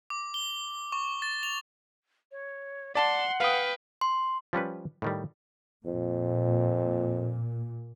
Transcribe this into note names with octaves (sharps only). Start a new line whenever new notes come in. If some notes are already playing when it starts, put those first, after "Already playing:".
D6
G7
C#6
A6
F7
C#5
D5 F#5 A5 C6
B4 F5 G5 D#6
C6
F3 G3 C#4 B4
A2 D#3 G3
F2 A#2